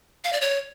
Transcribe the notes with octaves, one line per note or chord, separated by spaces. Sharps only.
F5
D5
C#5